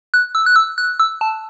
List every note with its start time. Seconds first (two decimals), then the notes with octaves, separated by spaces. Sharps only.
0.14 F#6
0.35 E6
0.46 F#6
0.56 E6
0.78 F#6
1.00 E6
1.21 A5